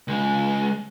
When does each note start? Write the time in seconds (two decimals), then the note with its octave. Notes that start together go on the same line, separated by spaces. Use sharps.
0.08 C#2 G#3